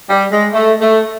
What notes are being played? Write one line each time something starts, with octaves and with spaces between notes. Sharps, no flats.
G3
G#3
A3
A3